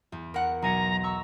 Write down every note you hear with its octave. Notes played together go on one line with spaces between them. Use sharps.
E2
A#4 F#5
B1 G#5 A#5 C#7
A#5 C#6 E6